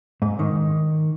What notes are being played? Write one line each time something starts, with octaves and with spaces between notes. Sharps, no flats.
G#2
D#3